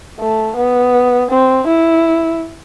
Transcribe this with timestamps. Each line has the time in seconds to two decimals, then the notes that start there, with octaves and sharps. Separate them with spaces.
0.19 A3
0.56 B3
1.30 C4
1.67 E4